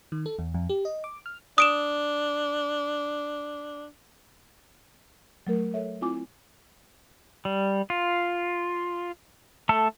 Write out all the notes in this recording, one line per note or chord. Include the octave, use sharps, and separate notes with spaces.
D#3
A4
E2
F2
G4
D#5
D6
F6
D4 D#6 D7 E7
F#3 A3 A#4
A4 C#5 E5
C4 E4 F4 G#5 D6
G3
F4
A3 A4